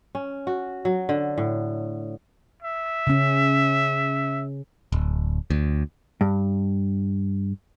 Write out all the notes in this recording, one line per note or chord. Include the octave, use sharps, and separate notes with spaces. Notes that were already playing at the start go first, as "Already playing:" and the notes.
C#4
F#4
F#3
D3
A2
E5
C#3 C#4
D1
D2
G2